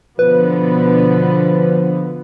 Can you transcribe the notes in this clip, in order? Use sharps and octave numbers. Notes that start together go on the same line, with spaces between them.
B2 D3 F3 B3 B4